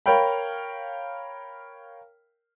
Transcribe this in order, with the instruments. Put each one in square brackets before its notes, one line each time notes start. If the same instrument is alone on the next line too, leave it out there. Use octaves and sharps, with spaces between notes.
[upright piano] A#4 C#5 F5 G5 B5